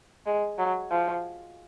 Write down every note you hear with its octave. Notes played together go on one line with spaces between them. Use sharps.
G#3
F#3
F3